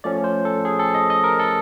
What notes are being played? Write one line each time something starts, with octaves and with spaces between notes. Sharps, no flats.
F3 A3 C#4 D5
C5
A4
G#4
A4
D#5
D#5
A#4
A4